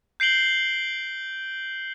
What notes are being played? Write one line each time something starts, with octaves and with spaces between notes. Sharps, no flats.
G6 C7 D7 F#7 G7